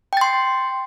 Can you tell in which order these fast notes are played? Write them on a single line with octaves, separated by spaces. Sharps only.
G5 A6 C6